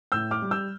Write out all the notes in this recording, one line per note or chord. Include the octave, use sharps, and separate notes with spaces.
A2 E6 G6
D6 F6
G3
E6 G6